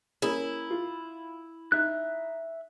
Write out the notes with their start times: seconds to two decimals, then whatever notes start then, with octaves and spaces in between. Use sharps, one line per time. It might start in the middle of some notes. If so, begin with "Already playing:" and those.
0.22 A#3 C#4 E4 G#4
0.70 F4
1.72 D#4 E5 F#6